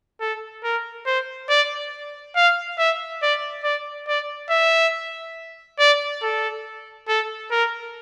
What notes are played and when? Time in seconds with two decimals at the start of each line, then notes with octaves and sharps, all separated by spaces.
0.20 A4
0.64 A#4
1.06 C5
1.49 D5
2.36 F5
2.78 E5
3.22 D5
3.64 D5
4.08 D5
4.50 E5
5.79 D5
6.22 A4
7.08 A4
7.51 A#4